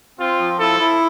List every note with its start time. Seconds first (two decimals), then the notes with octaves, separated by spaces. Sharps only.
0.19 C4 F4
0.39 F3
0.60 E4 A4
0.80 E4